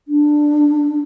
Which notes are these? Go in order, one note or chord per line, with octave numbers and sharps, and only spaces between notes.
D4